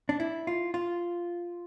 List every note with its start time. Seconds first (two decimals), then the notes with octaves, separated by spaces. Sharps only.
0.09 D4
0.20 E4
0.47 F4
0.74 F4